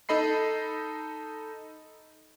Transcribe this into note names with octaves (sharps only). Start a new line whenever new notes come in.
D#4 A4 D#5 B5 C7